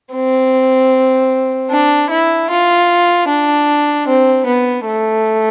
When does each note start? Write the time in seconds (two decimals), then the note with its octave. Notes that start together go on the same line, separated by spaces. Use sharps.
0.13 C4
1.71 D4
2.10 E4
2.50 F4
3.28 D4
4.07 C4
4.46 B3
4.86 A3